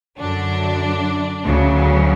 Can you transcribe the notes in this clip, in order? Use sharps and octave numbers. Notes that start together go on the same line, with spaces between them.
F#2 D3 F#3 D4
D2 C#3 F#3